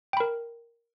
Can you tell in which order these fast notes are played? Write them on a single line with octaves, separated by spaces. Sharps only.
G5 B5 A#4